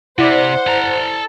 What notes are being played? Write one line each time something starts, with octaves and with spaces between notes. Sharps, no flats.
C3 E4 C5 D5 F#5
A4 A#5